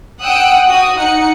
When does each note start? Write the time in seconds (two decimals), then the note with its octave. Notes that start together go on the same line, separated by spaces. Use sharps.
0.22 F#5 G5 D#6 E6 F#6 D7
0.67 F#4 D#6
0.96 D#4 F#5 F#6 C#7